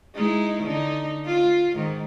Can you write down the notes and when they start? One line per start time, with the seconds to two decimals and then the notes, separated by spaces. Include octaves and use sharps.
0.15 G#3 D#4 E4
0.64 D3 D#4
1.26 F4
1.74 G#2 D#3